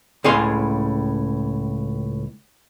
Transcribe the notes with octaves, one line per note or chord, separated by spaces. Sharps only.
C#2 A2 G#4 F5 C6